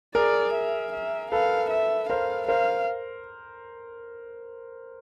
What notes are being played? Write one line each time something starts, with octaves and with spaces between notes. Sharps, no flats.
G#4 A#4 D5
E5
E5
A4 B4 F5
E5
A#4 C5 F5
A#4 C5 F5